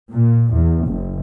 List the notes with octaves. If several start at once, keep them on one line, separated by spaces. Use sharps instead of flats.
A#2
E2
F#1